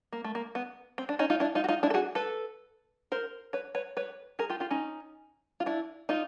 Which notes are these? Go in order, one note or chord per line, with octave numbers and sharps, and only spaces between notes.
A#3
A3
A#3
B3
C4
D4
C#4 D#4
D#4 F4
D4 E4
D#4 F4
F#4
D#4 F4
D4 E4
A4
F#4 G#4
A4 B4
A#4 C5
B4 C#5
B4 C#5
B4 C#5
G#4 A#4
F4 G4
F4 G4
C#4 D#4
F4
D4 E4
D#4 F4